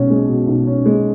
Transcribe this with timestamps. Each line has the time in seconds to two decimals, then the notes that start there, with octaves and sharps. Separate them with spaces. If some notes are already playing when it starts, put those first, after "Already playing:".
Already playing: B1 B2 G#3 C#4
0.10 G#3
0.28 B2
0.47 B1
0.67 C#4
0.86 G#3